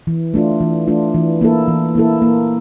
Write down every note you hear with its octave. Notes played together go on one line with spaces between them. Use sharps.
E3
A3 D4 F4
E3
A3 D4 F4
E3
A#3 E4 A4
E3
A#3 E4 A4
A#3